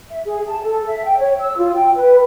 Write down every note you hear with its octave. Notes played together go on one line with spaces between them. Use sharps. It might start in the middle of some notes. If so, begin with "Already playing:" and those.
E5
G#4
A5
A4
E5
G5
C#5
E6
F4
G5
B4